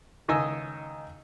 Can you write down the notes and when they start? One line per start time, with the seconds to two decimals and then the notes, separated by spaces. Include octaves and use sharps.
0.28 C#2 D#3 D#4 D#5 G#5 E6